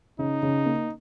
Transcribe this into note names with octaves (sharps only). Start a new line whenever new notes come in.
C#3 D#4
C#3
A#3